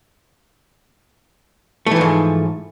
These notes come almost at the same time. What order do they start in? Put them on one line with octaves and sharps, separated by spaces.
A3 E3 F3 G#2